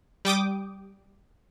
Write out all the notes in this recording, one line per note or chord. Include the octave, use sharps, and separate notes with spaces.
G3 G5 D6 D#6